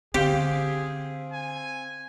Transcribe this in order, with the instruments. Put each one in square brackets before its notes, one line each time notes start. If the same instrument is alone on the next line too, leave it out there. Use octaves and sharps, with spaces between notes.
[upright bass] D3 [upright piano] C4 F5 [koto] G4 [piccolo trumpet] G#4
[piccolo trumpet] G#5